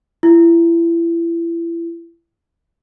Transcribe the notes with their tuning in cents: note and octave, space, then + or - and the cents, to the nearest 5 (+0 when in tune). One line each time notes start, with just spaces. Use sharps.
E4 +30